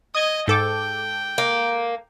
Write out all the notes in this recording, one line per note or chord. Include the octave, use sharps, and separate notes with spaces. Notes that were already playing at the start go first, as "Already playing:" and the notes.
D#5 D#6 G#6
G#2 A4 G5 D6
A#3